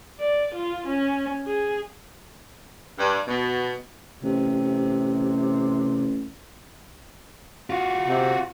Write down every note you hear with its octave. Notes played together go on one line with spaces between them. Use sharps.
D5
F4
C#4
G#4
G2
B2
A1 C3
F4 F#4
C3